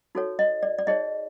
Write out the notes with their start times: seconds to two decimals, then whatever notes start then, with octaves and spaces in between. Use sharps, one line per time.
0.15 D#4 F#4 A4 C#5
0.39 D#5
0.63 D5
0.78 D5
0.87 D#4 G#4 C#5 D#5